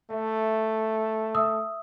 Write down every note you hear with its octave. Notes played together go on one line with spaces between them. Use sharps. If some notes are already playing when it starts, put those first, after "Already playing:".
A3 E5
E5 D#6 E6